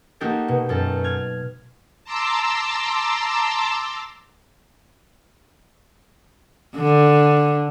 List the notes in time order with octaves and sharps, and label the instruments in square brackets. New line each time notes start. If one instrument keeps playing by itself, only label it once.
[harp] A#3 D#4 F#4 G4 A4
B2
F#2 A4 A5
F6 G#6
[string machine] A5 A#5 C6 D6 E6
[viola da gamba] D3